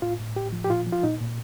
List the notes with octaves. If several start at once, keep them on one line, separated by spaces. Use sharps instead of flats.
A2 F4
A2
A2 G4
F3
G4
A#2 F4
F3
F4
A#2 D#4
A#2